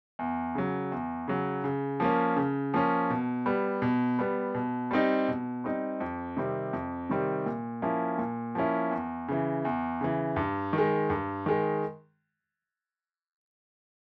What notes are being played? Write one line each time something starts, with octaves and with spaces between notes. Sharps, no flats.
E2
C#3 F#3
E2
C#3 F#3
C#3
F3 A#3 C#4
C#3
F3 A#3 C#4
B2
G3 B3
B2
G3 B3
B2
G3 C4 D#4
B2
G3 C4 D#4
F2
C3 D#3 G3 C4
F2
C3 D#3 G3 C4
A#2
F3 A#3 C#4 E4
A#2
F3 A#3 C#4 E4
E2
C#3 E3
E2
C#3 E3
G2
D#3
G#3
G2
D#3 G#3